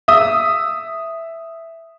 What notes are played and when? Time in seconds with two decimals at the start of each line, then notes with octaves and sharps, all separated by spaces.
0.08 E5 D#6 E6